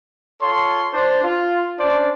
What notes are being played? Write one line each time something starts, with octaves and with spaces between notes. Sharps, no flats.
F4 A4 C#5 C6
D4 C5
F4
C#4 D4 C5 D5